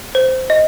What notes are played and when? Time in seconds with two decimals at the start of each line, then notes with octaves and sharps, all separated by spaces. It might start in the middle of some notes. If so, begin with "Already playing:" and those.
0.15 C5
0.50 D#5